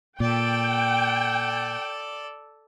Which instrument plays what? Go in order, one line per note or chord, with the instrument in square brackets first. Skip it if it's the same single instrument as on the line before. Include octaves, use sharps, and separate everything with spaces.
[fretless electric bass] A#2 [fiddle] A4 D5 [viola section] G5